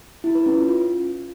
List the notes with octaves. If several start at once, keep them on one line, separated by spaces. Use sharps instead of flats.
E4
B4
C#4
F4
F4